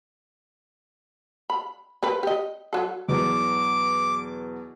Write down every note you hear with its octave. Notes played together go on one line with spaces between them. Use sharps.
B5
C4 A#4 B4
G4 D#5
F#3 A4
E2 B2 F#3 D6